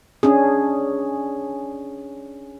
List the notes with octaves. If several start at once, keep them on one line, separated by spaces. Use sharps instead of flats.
C#4 D4 G#4